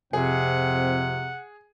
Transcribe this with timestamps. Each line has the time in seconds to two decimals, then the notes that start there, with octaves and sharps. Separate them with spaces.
0.13 F2 C3 C4 G#4 F#5